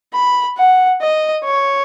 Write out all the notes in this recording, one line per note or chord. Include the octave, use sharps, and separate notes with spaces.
B5
F#5
D#5
C#5